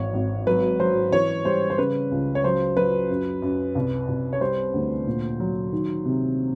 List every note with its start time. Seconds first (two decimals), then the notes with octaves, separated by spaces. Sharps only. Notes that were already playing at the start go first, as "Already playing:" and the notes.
Already playing: G#1 E3 C#5
0.14 G#1
0.47 F#3 B4
0.80 F#3 C5
1.12 E3 C#5
1.45 G3 C5
1.70 C5
1.78 C#3 B4
2.11 C#2
2.35 C#5
2.44 F#3 C5
2.76 F#3 B4
3.10 F#2
3.42 F#2
3.75 C2
4.08 C2
4.33 C#5
4.41 G3 C5
4.74 D2
5.07 A#2
5.40 F#3
5.72 D#3
6.05 C3